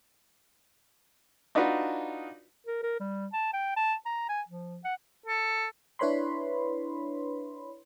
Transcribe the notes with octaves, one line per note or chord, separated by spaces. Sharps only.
D4 D#4 F4 F#4 B4 F#5
A#4
A#4
G3
A5
G5
A5
A#5
G#5
F3
F#5
A4
D4 E4 B4 C#5 B5 C6